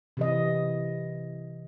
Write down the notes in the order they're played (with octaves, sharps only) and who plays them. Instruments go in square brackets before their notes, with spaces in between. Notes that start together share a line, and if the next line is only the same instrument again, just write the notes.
[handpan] C3 E3 D#5